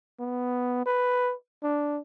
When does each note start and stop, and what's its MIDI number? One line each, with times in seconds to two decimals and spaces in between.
0.19 0.85 59
0.86 1.33 71
1.63 1.99 62